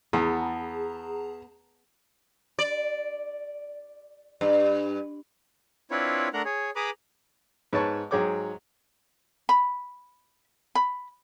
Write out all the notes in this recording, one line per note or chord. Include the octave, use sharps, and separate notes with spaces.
E2 B3 G#4 A5 A#5
D5
G2
C4 D4 E4 F4 B4 C#5
A3 D4 A#4 F#5 A#5 F#6
G#4 C#5
G#4 B4 A#5 B5 D6 D#6
G#2 B4 C#5 A5 C#6
G#2 F#3 G#4 C#5 G5 D6
B5
B5